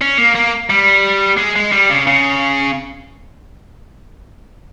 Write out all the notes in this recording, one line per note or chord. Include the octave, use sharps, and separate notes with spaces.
C#4
A#3
A#3
G3
G#3
G#3
G3
C#3
C#3